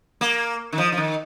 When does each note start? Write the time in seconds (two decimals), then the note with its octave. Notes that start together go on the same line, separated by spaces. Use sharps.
0.21 A#3
0.72 D#3
0.78 F3
0.92 F3
0.97 D#3